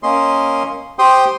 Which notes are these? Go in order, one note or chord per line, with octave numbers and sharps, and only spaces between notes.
A#3 C#4 D#5 C6
G4 C5 G5 C6 D#6